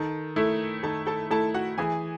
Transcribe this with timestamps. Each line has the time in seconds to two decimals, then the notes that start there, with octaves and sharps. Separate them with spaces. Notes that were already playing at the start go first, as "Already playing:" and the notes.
Already playing: D#3 A4 A5
0.36 A3 E4
0.83 D#3 A4 A5
1.07 A4 A5
1.31 A3 E4 A4 A5
1.54 F#4 F#5
1.78 E3 G#4 G#5